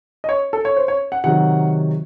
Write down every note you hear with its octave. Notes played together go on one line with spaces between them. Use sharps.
D#5
C#5
A4
C#5
C5
C#5
F#5
C3 D#3 F#3 F#5